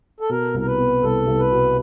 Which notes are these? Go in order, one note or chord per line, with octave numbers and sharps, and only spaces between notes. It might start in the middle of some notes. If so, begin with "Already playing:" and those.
A4
B2 A#4
C2
A#4
B4
B3
C2 A4
C2
B4
B2